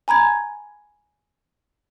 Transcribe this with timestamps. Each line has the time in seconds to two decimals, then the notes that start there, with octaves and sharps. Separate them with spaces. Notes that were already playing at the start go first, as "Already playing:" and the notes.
0.08 G#5 A#5 B5 G#6